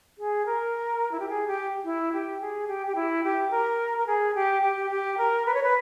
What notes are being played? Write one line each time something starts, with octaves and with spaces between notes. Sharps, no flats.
G#4
A#4
E4
G4
G#4
G4
E4
G4
G#4
G4
G4
E4
G4
A#4
A#4
G#4
G4
G4
G4
A#4
B4
C#5
B4